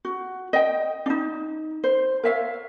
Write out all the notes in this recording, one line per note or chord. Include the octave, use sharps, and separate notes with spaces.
F#4
D#5 G5
D4 D#4
C5
A#4 C#5 E5 F5